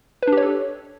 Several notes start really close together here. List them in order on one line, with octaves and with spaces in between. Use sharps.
B4 D4 G4 C#5 A4